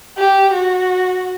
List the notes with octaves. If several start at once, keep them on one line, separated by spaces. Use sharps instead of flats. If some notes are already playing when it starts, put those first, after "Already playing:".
G4
F#4